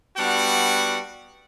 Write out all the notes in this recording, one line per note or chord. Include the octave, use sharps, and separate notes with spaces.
G3 B3 D4 F#4 F#5